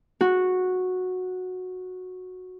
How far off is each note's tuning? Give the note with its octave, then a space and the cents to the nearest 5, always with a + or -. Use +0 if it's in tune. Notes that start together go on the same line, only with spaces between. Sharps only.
F#4 -10